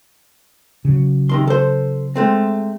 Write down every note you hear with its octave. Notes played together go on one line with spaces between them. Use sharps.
C#3 F#3
C3 D#3 C6
A4 C5
G#3 A3 C4